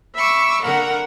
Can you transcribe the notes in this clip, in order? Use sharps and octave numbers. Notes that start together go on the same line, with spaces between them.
E5 B5 C#6 D6 E6
D3 A#3 A#4 F#5 A#5